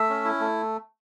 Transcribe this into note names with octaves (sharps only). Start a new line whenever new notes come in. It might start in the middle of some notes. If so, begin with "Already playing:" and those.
Already playing: A3 E5
C#4
E4
A3